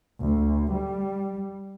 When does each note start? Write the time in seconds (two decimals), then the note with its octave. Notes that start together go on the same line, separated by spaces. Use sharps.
0.20 D2
0.72 G3